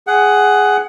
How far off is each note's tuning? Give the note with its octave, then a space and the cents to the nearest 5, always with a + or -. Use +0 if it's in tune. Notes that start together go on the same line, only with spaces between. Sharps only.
G#4 +0 F#5 +15